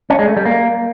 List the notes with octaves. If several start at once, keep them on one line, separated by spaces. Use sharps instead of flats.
C#4
G#3
A3
G3
A#3